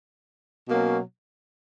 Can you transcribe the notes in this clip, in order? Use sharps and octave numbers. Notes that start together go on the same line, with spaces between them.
B2 F#3 A#3 C#4